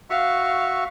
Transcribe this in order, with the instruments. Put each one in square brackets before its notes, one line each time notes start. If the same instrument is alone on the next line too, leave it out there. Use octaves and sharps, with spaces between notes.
[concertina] F#4 E5 C#6 [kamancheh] F5